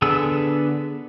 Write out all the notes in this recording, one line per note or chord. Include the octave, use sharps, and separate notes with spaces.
D3 B3 G#4 A4 E6